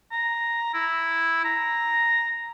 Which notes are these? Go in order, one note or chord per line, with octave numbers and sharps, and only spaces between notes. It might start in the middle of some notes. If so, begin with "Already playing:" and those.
A#5
E4
A#5